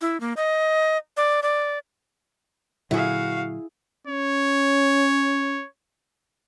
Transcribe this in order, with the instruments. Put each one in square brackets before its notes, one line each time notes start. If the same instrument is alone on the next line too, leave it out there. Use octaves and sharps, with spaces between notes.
[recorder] E4
A#3
D#5
D5
D5
[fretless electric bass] A#2 D3 F#3 [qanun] E4 G#4 [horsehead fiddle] F#4 F5
[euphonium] C#4 [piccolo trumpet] C#5